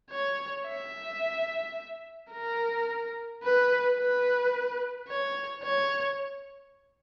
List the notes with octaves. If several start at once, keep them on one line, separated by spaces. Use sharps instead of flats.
C#5
E5
A#4
B4
B4
C#5
C#5